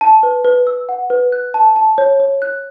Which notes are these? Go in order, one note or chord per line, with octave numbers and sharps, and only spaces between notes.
A5
B4
B4
E6
F#5
B4
F#6
A5
A5
C#5
C#5
F#6